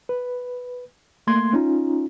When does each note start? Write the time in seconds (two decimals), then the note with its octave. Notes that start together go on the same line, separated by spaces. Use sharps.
0.09 B4
1.27 A3 A#3 C6 G#6
1.53 C#4 D#4 F4